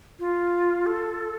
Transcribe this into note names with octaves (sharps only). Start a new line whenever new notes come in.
F4
A4